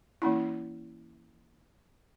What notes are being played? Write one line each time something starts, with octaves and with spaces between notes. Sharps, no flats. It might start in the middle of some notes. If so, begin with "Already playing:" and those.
E3 A#3 C#4 E4